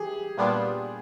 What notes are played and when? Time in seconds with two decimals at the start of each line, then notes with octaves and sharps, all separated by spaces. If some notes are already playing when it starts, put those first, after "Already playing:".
Already playing: E3 G4 G#4
0.37 A#2 G3 B3 D4 F4